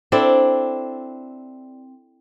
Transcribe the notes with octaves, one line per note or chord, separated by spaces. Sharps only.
C4 D4 E4 A4